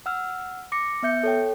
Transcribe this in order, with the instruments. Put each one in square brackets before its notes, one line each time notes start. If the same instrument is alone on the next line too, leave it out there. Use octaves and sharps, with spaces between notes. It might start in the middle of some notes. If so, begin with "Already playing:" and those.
[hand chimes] F#5 E6 F6
D6 A#6 C#7
B3 E5 G6 C#7
A4 C#5 G5